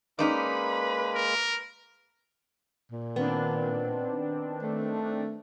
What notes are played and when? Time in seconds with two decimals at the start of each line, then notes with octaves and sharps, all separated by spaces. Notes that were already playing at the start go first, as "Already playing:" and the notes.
0.19 G#3 A#3 C#4 D#4 B4 D5 B5
1.15 A#4
2.92 A#2
3.16 D#3 B3 C4 D4
4.63 A3